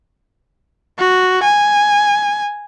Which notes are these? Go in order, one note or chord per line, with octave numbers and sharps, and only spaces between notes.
F#4
G#5